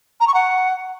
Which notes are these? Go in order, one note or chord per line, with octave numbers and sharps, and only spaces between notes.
A#5
C#6
F#5